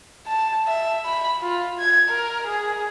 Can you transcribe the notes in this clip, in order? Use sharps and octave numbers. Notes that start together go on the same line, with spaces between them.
A5
E5
B5
F4
G#6
A#4
G#4